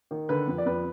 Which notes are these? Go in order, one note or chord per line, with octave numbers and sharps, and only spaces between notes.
D#3
D3 B4
F2
D5
F2 B4